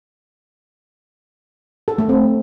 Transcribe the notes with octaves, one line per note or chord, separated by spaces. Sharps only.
A4
A3
C4